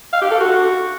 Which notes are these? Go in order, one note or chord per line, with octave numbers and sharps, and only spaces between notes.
F5
G4
A4
F#4